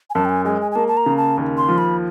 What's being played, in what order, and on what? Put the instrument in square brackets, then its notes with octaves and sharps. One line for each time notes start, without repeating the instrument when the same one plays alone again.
[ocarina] G#5
[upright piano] F#2 [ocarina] A5
[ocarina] G5
G#5
[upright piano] G#3 [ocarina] G#5
[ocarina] G#5
G#5
[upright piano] A#3 [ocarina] A5
[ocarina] A5
A#5
[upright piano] C#3
[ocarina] A5
[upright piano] D#2
[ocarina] C6
[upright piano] F3
[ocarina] B5